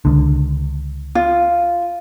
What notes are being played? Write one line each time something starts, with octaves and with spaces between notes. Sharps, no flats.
C#2 D3
F4